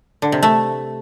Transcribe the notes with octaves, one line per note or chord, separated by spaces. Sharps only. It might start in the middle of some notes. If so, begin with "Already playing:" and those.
D3
C3
A3